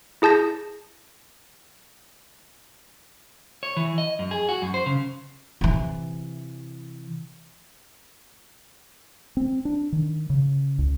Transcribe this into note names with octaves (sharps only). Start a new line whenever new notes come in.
E4 G#4 A5 G6 A#6
C#5
E3
D#5
F#2
G#4
F#4
F#2
C5
C#3
C3 E3
C4
D4
D#3
C#3
C#2